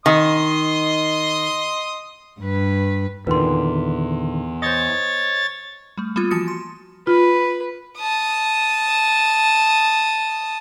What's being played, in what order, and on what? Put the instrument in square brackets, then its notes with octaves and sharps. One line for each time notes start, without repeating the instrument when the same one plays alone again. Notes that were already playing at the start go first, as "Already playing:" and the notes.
[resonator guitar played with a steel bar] D#3 [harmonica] D#5 C6 D#6
[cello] G2 B4
[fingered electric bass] E2 [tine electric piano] A#2 D3 D#3 [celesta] B4 C6
[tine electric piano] C5 D#5 [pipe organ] C#5 A6
[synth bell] G3 A3
G3 A#3 B3 F4
E3 F3 F#4 D#6 A6 C#7
C6
[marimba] F4 [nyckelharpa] B4
[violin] A5 D#6